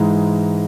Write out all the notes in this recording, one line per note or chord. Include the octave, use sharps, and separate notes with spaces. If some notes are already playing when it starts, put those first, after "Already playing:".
Already playing: G#2 E3 G#3 A#5